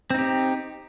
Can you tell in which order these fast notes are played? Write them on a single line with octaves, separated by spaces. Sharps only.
C4 D#4 G4